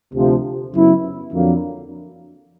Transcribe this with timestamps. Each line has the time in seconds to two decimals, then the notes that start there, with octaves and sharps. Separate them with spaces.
0.14 D2 C3 F3
0.74 F#2 C#3 F#3 B3 E4
1.33 F2 D3 F#3 A#3